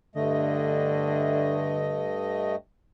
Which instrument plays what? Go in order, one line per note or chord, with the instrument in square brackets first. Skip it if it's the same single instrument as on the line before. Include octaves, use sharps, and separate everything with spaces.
[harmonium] G2 A3 D#5 [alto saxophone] D3